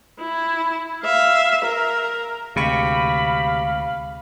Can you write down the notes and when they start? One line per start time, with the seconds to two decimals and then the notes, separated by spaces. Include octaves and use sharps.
0.20 E4
1.04 E5 F5
1.65 A#4
2.56 D2 C3 G#3 F5 B5 C#6